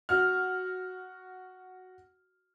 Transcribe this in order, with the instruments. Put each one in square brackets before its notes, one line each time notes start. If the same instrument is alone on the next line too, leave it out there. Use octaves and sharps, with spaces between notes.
[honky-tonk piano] F#4 F6